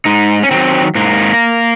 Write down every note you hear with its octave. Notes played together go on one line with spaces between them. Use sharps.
G#2 D#4
C#4
D#3 F#3 C4
G#2 A#3